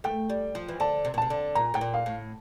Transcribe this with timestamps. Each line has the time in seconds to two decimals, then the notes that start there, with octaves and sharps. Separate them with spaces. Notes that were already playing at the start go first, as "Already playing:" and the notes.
0.04 A3 G5
0.30 G3
0.55 F3
0.69 E3
0.80 D3 A5
1.05 C3
1.14 A#2
1.18 C3 A5
1.30 D3
1.55 A#2 A#5
1.74 A2 G5
1.81 A#2
1.94 F5
2.06 A2